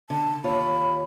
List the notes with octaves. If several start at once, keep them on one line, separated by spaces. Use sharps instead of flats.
D3 A5
D#2 F4 C#5 B5